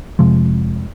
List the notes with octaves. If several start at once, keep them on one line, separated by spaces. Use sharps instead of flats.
F1 C3 F3 G#3